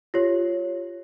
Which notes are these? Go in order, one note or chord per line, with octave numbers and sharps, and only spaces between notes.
F4 G4 C#5